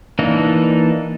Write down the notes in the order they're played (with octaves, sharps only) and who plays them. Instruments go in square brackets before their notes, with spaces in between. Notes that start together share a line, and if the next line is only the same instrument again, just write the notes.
[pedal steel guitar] E3 A#3 D4 D#4